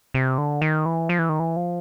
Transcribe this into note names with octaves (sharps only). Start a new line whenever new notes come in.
C3
D3
D#3
E3
F3
E3
D#3
E3
F3